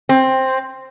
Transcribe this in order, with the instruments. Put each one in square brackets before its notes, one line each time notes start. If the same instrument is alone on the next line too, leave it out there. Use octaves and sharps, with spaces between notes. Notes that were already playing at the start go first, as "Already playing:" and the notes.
[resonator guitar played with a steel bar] C4